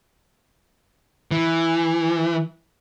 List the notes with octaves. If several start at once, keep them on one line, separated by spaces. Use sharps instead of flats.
E3